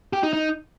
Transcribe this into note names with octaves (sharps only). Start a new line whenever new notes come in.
G4
D#4
D#4